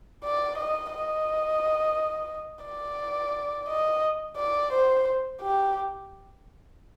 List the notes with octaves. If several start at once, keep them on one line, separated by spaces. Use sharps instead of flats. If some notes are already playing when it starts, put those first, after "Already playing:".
D5
D#5
D#5
D5
D#5
D5
C5
G4